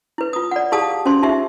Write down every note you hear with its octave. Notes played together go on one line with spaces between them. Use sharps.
E4 B4
F4 D#6
D5 F#5
E4 G4 G#4 F5 A5 D#6
C#4 F#4 C5 C6
D#4 F4 G4 E5